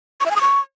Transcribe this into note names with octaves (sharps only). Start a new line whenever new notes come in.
C#6
E5
G#5
D#6
C#6